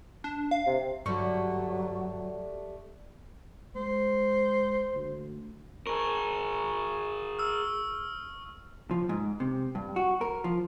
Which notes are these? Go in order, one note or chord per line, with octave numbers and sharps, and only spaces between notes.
D4
F5
C3
G2 D3 F#3 G3 A3 C#6
G#3 C5
D2
G#4 A#4 C#6
E6 F6
F3
G#2
C3
G2
F#4
A#4
F3